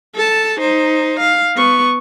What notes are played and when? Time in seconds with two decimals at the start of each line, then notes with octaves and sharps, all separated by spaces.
0.15 A4 A5
0.60 D#4 C5
1.20 F5
1.56 B3 C#6